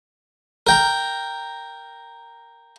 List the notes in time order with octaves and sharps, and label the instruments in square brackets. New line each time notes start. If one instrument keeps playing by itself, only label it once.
[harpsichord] A#4 G5 A#5